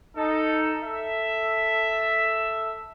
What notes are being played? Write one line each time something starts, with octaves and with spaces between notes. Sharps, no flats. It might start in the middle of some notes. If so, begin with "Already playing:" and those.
D#4 A4
A4 E5